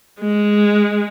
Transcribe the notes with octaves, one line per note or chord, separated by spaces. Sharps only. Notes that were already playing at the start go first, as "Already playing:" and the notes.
G#3